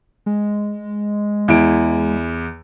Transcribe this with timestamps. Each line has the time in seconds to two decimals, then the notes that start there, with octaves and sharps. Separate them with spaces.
0.26 G#3
1.48 E2 E4 D7